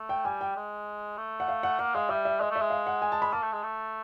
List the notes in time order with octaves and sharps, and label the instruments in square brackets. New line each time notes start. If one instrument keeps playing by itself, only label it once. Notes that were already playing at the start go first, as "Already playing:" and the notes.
Already playing: [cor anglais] A3
[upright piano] G5
[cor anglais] G3 [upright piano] G#5
[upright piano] G5
[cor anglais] G#3
A3
[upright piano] F#5
F5
F#5
[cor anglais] A#3 [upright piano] F#5
[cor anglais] G#3 [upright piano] F5
[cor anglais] G3 [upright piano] E5
[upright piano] E5
[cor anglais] G#3 [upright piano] D#5
[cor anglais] A3 [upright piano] E5
[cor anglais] G#3
[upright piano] F5
F#5
G#5
A5
B5
[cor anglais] A#3 [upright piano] A5
[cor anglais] A3
G#3
A3